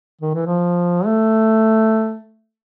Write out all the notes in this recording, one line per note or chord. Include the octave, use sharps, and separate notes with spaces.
D#3
E3
F3
A3